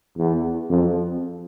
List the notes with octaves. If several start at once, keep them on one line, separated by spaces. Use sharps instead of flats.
E2
F2